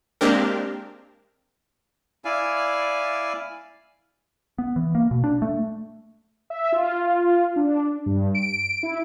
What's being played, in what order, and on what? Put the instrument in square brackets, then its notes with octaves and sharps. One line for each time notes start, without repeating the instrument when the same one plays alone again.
[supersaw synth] G#3 A#3 C4 D4 G4 A#4
[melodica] E4 D5 F5 G#5
[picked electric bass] B3
E3
A#3
B2
D4
A3
[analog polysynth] E5
F4
D4
G2
D7
E4